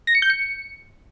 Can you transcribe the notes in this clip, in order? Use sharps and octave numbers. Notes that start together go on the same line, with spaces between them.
A#6
C#7
G6
C#7